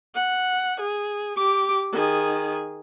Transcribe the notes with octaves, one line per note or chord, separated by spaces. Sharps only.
F#5
G#4
G4 D6
D#3 G#4